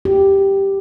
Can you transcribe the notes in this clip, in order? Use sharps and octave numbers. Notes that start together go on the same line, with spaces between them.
G4